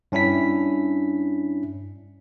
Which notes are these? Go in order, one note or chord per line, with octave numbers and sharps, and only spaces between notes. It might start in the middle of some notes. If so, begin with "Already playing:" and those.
G2 C#4 D4 E4 B6